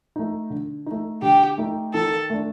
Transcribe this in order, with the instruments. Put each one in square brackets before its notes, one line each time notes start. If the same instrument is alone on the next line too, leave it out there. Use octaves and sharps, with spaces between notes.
[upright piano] A3 D#4
D3
A3 D#4
[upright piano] D3 [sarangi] G4
[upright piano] A3 D#4
[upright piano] D#3 [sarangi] A4
[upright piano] A3 D4